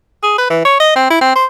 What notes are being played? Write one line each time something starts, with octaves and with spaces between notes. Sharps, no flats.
G#4
B4
E3
C#5
D#5
C4
E4
C4
C5